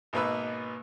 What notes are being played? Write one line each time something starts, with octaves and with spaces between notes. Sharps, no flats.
G#1 B2 A#3 D#4 B4 E6